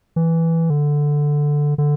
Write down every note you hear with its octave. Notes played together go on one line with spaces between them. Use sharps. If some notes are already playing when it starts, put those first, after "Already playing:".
E3
D3
D3